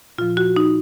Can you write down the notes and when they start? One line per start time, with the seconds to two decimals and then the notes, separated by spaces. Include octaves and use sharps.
0.18 A#2 F3 F4
0.37 F#4
0.56 D#4